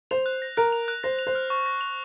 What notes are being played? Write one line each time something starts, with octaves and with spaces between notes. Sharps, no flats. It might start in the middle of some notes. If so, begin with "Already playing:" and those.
C5 F7
F#6
A#6
A#4 F#6
F7
F#6
C5 A#6
F7
C5
F6
C#6
A#6
F7